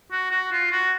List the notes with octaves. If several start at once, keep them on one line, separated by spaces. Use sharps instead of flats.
F#4
F#4
F4
F#4